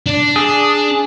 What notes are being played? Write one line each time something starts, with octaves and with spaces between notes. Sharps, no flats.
D4
G#4